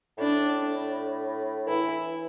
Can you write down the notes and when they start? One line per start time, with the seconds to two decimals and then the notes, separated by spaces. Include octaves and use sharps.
0.18 A2 D4
1.68 E3 E4